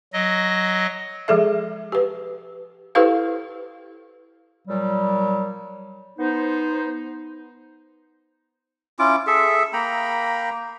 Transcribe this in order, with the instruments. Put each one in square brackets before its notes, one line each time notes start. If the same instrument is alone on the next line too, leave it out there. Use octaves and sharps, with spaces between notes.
[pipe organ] F#3 D#5
[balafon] F3 G#3 G#4 A4 E5
G4 B4
E4 G4 A4 B4 C5 F5
[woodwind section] A#2 F#3 G3
B3 D#4 C5
[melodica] C#4 E4 F4 D6
G#4 A4 E5
A#3 G5 A#5 B5